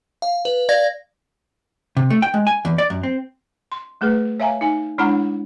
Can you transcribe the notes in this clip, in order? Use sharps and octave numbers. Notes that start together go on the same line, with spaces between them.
F5
B4
D5 F5 G#6 A#6
C3
A3
G5
G#3
G#5
E2
D5
F#2
C4
C6
G3 A3 G#4 B4
C#5 E5 F5 G#5 A#5
D#4 G#5
G#3 D4 E4 C#5 F#5 A#5